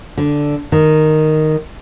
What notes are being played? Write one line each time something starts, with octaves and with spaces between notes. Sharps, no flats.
D3
D#3